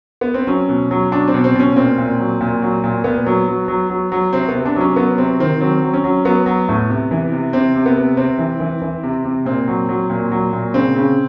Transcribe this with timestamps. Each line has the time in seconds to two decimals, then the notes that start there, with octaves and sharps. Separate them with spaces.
0.21 B3
0.34 C4
0.47 F#3 C#4
0.69 B2
0.91 F#3
1.12 F#3 D4
1.28 C4
1.34 B2
1.44 C4
1.55 B2
1.60 C#4
1.76 A#2 C4
1.98 A#2
2.19 F#3
2.41 A#2
2.62 F#3
2.84 A#2
3.04 A#2 B3
3.26 F#3
3.48 F#3
3.68 F#3
3.90 F#3
4.12 F#3
4.33 C3 C4
4.48 B3
4.55 C3
4.65 D4
4.76 F#3 C#4
4.96 F#3 B3
5.18 C3 C4
5.40 D#3 C4
5.61 F#3 C4
5.82 F#3
5.94 C#4
6.04 F#3
6.25 F#3 B3
6.46 F#3
6.69 A2
6.90 C3
7.11 E3
7.32 C3
7.53 C3 C4
7.76 C3
7.86 B3
7.97 C3
8.17 C3 C4
8.38 E3
8.60 E3
8.82 E3
9.03 C3
9.25 C3
9.45 A#2 C4
9.68 F#3
9.89 F#3
10.10 A#2
10.32 F#3
10.53 A#2
10.74 C#3 C4
10.96 C#3